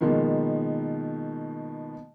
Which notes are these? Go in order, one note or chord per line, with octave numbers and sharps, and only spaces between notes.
B2 D#3 F3 G#3 A#3